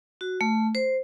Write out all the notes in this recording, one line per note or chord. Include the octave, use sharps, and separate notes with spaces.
F#4
A3
C5